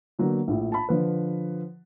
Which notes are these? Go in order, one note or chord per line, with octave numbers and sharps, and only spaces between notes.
D3 F#3 A#3 B3
A#1 A2
A5 B5
D3 F3 B4